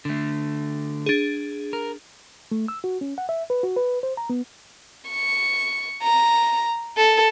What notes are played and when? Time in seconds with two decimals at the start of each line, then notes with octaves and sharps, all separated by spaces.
0.05 D3 A3
1.06 D4 G#4
1.73 A#4
2.51 A3
2.68 E6
2.84 F#4
3.01 C#4
3.18 F#5
3.29 E5
3.50 B4
3.63 F#4
3.76 B4
4.03 C5
4.17 A#5
4.30 B3
5.10 C#6
6.03 A#5
6.97 A4